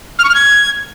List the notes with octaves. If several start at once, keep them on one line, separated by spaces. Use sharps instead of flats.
F6
C#6
F6
G#6